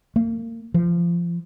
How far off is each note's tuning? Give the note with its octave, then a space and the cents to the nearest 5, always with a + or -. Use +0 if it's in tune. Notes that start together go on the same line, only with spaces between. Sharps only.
A#3 -30
F3 -20